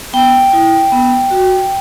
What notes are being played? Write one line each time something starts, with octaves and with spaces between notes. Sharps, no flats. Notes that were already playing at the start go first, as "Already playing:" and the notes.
B3 G5
E4
B3
F#4